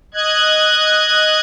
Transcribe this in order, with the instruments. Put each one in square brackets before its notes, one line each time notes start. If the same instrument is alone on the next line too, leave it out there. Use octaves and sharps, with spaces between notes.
[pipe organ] D#5 F#6 G#6